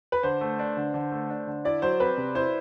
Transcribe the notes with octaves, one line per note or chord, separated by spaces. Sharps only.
B4
D3 C5
A3
D4
D3
D3
A3
D4
D3
E4 D5
F#3 C5
C4 B4
C3
E4 C5